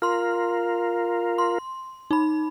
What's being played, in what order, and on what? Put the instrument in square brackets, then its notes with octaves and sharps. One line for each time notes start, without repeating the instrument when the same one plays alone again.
[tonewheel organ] F4 A#4 [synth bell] C6 F6
[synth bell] C6
D#4 B5